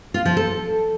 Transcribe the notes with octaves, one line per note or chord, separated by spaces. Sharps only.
F4
F3
A4